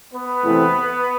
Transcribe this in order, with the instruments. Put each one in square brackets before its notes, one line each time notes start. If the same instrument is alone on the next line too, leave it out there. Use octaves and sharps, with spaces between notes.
[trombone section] B3 B4
E2 C3 E3 A3 C4